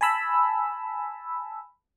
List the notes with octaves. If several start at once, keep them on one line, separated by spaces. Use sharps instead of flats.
G#5 A5 B5 E6